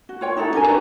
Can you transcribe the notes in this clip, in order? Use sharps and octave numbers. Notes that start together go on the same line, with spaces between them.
F#4
F4 C#5 G5
D#4 E4 F#4 A4
D4 G4 A#4 G#5
E4 G4 B4 D5